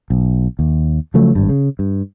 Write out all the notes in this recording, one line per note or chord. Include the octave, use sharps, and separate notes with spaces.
B1
D#2
C#3 F3 F#3 A3
G#1 G2
C#3
G2